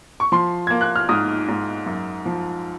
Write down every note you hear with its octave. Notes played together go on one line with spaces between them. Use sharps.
C#6
F3 C6
A#3 G#6
F#6
F6
G#2 D#6
G#2
F#2
F3